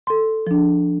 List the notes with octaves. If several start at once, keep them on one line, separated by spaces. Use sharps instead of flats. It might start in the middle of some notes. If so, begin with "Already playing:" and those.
A4 C6
F3 D4